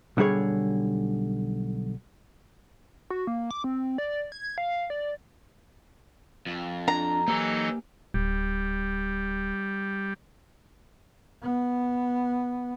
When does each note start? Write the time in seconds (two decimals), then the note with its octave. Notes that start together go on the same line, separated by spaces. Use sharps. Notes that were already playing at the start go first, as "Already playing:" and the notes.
0.17 B1 D3 G3 G#4 C#5
3.10 F#4
3.27 A#3
3.51 D6
3.64 C4
3.98 D5
4.32 G#6
4.58 F5
4.90 D5
6.46 F2
6.88 D4 A#5
7.28 E3 F#3 A#3 D#4 G4 A4 G#5
8.14 D1 G3
11.43 B3